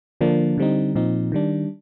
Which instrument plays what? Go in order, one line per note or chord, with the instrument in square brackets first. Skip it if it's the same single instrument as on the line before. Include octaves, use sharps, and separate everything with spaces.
[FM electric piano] D3 F3 A#3 D4
D3 G3 C4 D#4
A#2 F3 C4 D#4
D#3 G3 D4